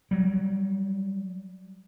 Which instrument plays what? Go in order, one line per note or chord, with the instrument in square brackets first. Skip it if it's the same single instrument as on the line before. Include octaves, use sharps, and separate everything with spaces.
[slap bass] F#3 G3